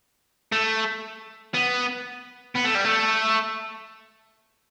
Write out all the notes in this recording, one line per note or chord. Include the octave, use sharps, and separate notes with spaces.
A3
B3
B3
A3
G3
A3